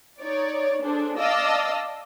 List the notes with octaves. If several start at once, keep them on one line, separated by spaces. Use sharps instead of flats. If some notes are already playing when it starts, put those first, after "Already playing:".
D#4 C#5 D5
D4 G#4 A4 C5
D5 D#5 F5 A5 D#6 E6